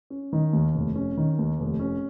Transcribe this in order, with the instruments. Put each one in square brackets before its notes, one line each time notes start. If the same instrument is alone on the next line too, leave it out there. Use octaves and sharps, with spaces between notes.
[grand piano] C#4
D#3
D#2
F1
C#4
D#3
D#2
F1
C#4